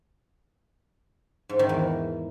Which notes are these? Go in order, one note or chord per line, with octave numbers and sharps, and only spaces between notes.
G#2
D#3
E2